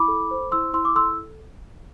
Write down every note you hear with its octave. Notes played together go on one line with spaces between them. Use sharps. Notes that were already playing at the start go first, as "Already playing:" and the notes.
Already playing: E4 B5 D6
A4
C5
E4 C6 E6
E4 C6 E6
D6
A4 C6 E6